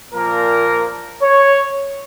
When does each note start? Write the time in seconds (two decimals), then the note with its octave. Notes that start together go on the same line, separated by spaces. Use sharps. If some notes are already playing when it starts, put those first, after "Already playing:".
0.12 A#2 F3 A#3 A#4
1.22 C#5